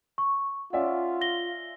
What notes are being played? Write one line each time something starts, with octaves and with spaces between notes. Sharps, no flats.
C#6
C#4 F4 D5 E5 F#5
A#6 G7